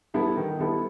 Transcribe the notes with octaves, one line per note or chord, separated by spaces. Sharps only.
G3 B3 E4 A4
D#3
G3 B3 E4 A4